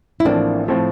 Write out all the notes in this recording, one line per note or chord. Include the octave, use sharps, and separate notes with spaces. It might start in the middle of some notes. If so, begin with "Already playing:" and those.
E4
A1 A2 F3 A#3 C4 D4
A2 F3 C4